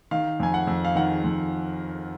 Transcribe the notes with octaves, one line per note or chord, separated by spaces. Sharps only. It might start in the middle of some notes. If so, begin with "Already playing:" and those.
D#3 F5
F2 G#5
F#5
F2
F5
D#3 F#5
F2